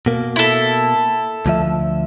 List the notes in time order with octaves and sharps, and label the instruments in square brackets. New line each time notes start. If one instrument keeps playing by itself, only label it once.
[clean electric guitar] B2 A#3
[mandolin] E4 A4
[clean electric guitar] D2 F3 E5